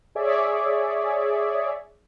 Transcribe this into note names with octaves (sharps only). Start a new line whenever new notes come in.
G#4 C#5 D5 E5